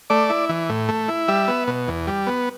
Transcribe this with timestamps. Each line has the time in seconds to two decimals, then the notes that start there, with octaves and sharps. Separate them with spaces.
0.10 A3 D5
0.30 E4
0.49 E3
0.69 A2
0.89 A3
1.08 E4
1.28 G3 E5
1.48 B3
1.67 B2
1.88 E2
2.07 G3
2.27 B3